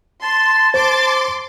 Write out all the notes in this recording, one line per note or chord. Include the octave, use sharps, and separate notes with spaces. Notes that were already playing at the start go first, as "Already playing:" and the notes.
A5 C6
C5 C6 D6